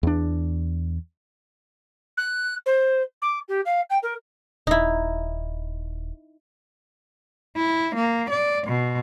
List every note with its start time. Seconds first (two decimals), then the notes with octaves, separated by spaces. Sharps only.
0.03 E2 D4
2.17 F#6
2.66 C5
3.22 D6
3.48 G4
3.65 F5
3.90 G5
4.03 A#4
4.67 D#1 D#4 E4
7.56 E4
7.95 A#3
8.30 D5
8.67 B2